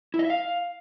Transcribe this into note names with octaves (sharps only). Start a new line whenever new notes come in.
E4
D#5
E5
F5